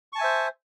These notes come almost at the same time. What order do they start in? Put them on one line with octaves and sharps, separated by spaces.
C#6 A5 G#5 E5 C5